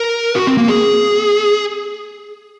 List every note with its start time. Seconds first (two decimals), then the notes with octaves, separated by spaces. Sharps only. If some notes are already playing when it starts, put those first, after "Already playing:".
Already playing: A#4
0.36 F#4
0.47 C4
0.57 A#3
0.68 G#4